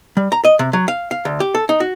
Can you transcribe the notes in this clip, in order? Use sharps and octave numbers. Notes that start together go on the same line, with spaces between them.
G3
A#5
D#5
C3
F#3
F5
F5
D2
G4
A4
D#4
F#4